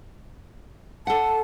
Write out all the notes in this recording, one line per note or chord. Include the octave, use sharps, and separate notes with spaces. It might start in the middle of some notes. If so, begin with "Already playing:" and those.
A4 F#5 A5